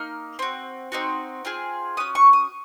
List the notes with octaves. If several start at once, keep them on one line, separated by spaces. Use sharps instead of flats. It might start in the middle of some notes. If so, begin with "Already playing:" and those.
Already playing: A#3 D#4 F6
C4 F#4
C4 D#4 F#4
C4 F4 G#4
C#4 F#4 D#6
C#6
D#6